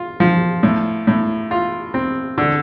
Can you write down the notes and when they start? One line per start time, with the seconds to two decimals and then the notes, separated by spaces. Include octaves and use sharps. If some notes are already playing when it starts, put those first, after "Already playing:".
Already playing: F4
0.20 F3
0.63 A2
1.07 A2
1.51 F4
1.94 C4
2.38 D3